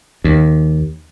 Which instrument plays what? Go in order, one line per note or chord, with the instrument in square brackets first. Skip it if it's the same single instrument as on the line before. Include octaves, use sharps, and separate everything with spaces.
[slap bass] D#2